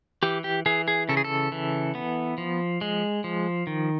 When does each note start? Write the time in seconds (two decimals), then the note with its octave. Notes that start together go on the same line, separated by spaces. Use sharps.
0.23 E3 G4
0.44 G4
0.66 E3 G#4
0.88 G#4
1.09 C#3 A4
1.17 G#4
1.24 A4
1.52 E3
1.95 B3
2.38 F3
2.81 G#3
3.24 F3
3.67 D#3